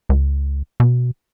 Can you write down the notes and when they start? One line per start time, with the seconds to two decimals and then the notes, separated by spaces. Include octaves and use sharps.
0.09 C#2
0.80 B2